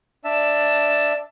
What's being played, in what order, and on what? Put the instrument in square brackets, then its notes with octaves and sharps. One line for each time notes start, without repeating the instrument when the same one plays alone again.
[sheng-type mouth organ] D4 E5 A5